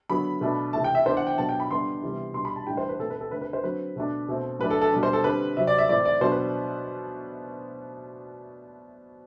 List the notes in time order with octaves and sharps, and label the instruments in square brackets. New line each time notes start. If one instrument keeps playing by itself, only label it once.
[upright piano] D3 F#3 B3 B5
B2 A3 D4
A3 A5
C3 E3
G5
E5
E3 B3 D4 C5
F#5
G5
B2 F#3 B3 D4 A5
G5
B5
D3 G3 B3 D4 C6
C3 E3 G3 B3
B2 G3 D4 C6
B5
A5
A2 E3 G3 D4 G5
C5
B4
B2 A3 C4 A4
B4
A4
D3 A3 C4 B4
B4
C5
D3 F#3 C4 B4
B2 A3 D4
B2 A3 C4
A2 F#3 A3 D4 B4
A4
A4
B2 G3 B3 D4
C5
A4
D3 G3 C4 B4
C3 F#3 C4 E5
D5
E5
A2 E3 A3 C4 D5
D5
B2 F#3 B3 D4 C5
B4